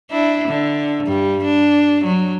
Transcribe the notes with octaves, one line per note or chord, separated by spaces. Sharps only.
D4 E4
D3
G2 G3
D4
F#3